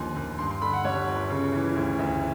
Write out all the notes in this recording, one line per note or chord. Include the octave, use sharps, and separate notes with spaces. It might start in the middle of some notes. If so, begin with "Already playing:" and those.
Already playing: D#2 D3 F3 G#5 C6
D#2
G2 C6
C6
D3 B5
F#5
G3 C#5
G1
C#3
E3
D2
D2